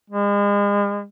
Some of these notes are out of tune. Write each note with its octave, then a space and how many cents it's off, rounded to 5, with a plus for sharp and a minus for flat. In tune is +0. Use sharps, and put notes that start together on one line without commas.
G#3 -40